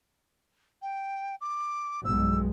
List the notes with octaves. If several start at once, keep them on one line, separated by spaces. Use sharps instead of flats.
G5
D6
B1 G2 G#3 E6